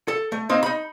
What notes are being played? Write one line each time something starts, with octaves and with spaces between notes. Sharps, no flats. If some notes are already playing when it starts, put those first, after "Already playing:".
A4
A3
A#3 C4 D#4
D#4 B5